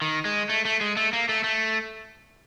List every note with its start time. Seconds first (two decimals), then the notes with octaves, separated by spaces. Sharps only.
0.02 D#3
0.25 G#3
0.49 A3
0.65 A3
0.81 G#3
0.97 A3
1.13 A#3
1.29 A3
1.44 A3